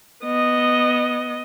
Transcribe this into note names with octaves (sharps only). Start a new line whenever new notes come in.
B3 D#5